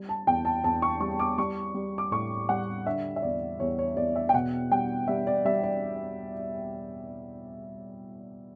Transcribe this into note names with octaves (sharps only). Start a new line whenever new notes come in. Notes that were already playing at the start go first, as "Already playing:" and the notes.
Already playing: G3
A5
E2 G5
A5
E2 A5
C#6
G3 C#6
D6
G3 C#6
G3
D6
A2 C#6
G3 F#5
D3 E5
E5
E2 D5
E2 C#5
C#5
E2 D5
E5
G5
B2 F#5
G3 G5
G3 E5
D5
G3 E5
D5